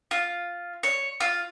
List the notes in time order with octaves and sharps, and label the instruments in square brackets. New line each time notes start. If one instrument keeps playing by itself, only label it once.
[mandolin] F4
C#5
F4